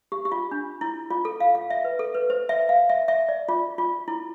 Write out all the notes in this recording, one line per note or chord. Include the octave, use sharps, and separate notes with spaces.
G4
G4
F4
D4
E4
F4
A4
F5
F5
E5
B4
A4
B4
C5
E5
F5
E5
E5
D5
F4
F4
E4